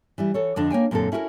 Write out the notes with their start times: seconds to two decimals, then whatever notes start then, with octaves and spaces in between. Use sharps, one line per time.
0.18 E3 G3 E4
0.34 E3 A4 C#5
0.56 F2 D3 D4 D#5
0.70 A#3 C#5 G5 G#5
0.91 F#2 A#2 D3 C4 A4
1.12 C#4 E4 F#4 G4 A#4